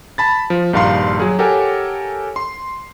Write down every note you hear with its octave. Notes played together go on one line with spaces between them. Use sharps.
A5 B5 A6
F3
A#1 G2 D#3 F5 A#5 C6
F#3 G#4
G4 A4 A#4 C#5 F#5 G#5
C6